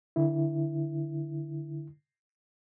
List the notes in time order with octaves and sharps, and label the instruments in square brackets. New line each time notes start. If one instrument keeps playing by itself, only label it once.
[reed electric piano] D3 E4